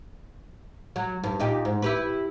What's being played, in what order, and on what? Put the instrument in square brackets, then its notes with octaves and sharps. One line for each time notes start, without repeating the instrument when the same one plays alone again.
[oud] F#3
G2
A#2 D#4 G4
G#2
E4 G4 B4